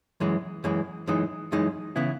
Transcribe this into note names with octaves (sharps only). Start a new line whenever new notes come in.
F#2 E3 G#3
F#2 E3 G#3
F#2 E3 G#3 D#4
F#2 E3 G#3 D#4
C#3 E3 B3 E4